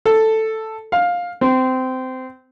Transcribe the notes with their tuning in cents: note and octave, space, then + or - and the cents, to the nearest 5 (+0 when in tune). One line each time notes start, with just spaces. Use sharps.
A4 +5
F5 +15
C4 -20